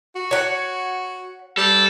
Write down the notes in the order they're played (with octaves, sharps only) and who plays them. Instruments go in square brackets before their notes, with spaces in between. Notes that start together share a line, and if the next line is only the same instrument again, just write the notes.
[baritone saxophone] F#4
[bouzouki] C#5 F#5
[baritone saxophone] G3 [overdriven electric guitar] A4